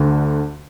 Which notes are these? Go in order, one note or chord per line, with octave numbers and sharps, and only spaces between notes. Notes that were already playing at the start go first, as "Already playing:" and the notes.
Already playing: D2 D3